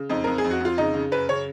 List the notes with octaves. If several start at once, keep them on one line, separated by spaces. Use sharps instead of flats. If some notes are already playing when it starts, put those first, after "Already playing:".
Already playing: C#3
F2 D#4
F2 A#4
G#4
F2
F#4
F2 F4
C#3 D#4
C#3
F#2 B4
C#3 C#5